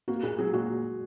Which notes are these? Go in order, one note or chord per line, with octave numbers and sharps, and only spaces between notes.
A#3 F#4
A#2 G#4
F#3 G#4
A#2 F#4